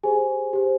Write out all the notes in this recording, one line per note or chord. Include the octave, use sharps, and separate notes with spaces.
G4 G#4 C5 G#5
G4 C5